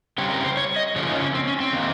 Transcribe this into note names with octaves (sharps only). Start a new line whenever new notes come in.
C#3 G3 C4 C#5
A#4
C5
C#5
D#5
C#3 F3 A#3 C#5
D#4
C#4
C4
C#4
C4
D#3 A#3